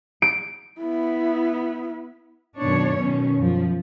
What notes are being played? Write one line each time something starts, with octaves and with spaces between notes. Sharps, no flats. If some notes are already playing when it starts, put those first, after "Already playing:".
D7
B3 E4
F#2 B2 D#3 B3 D4 C#5
B2 D#3 C#4
F#2 F3